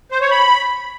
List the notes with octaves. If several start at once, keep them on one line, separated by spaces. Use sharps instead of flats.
C5
C#5
B5